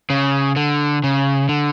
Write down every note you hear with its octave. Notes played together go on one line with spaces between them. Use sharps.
C#3
D3
C#3
D3